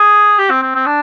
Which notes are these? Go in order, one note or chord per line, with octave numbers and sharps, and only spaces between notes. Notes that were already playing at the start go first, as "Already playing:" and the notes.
Already playing: G#4
G4
C4
C4
C4
D4